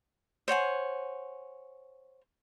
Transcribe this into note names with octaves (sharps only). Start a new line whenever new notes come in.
C5 C#5 F#5 G#5